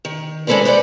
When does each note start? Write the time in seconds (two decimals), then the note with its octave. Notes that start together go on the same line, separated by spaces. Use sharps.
0.05 D#3
0.47 G#3 C#4 A4 B4 C5 D5
0.65 B4 C5 D5 F#5